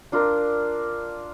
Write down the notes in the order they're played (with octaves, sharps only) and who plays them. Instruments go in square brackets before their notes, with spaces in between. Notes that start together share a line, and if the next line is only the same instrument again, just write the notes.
[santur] D4 F4 A#4